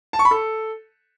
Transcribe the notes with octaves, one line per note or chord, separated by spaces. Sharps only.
A5
C#6
B5
A4